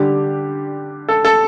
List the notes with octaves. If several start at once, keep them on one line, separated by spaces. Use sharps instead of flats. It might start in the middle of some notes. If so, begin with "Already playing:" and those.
Already playing: D3 G3 D4 G4
A4
A4